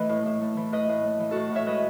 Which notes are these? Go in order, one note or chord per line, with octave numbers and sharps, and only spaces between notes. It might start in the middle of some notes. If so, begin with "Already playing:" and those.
Already playing: E3 A3 B4 D#5
A2
A2
A3
E3
A2 B4 D#5
A2
A3
E3
A2 F#4 A4
A2 C#5 E5
G#3 B4 D#5